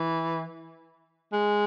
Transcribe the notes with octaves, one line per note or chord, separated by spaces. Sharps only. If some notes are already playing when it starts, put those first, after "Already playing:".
Already playing: E3
G#3